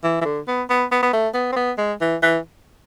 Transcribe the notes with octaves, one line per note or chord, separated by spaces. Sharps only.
E3
E3
D3
B3
B3
B3
B3
A3
B3
C4
B3
G#3
E3
E3